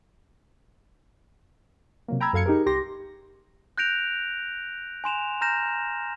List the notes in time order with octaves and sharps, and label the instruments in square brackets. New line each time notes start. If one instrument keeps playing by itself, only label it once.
[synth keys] C3 F#3 A#3
G5 A#5 B5 E6 G#6
F#2 A4 F5 G#6 C#7
D#4 G4 G#4 A#4
C2 G4 C6 A#6
[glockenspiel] F#6 G6 A#6 D7 F7
G#5 C6 E7 F7
A#5 F6 G6 A#6 E7